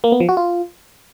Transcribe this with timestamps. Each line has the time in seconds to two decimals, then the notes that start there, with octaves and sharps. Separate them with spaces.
0.04 A#3
0.12 B3
0.20 F3
0.29 F#4
0.37 F4